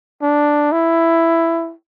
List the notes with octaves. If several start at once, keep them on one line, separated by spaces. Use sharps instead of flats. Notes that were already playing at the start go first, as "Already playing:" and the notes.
D4
E4